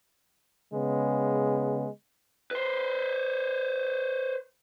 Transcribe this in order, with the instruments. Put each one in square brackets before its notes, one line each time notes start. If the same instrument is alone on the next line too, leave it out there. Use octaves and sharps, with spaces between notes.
[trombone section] C#3 G#3 B3
[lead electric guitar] B4 C5